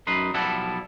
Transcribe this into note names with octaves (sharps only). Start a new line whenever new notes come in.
F#2 D#4 B4 C6
B1 F3 G3 E4 A4 F#5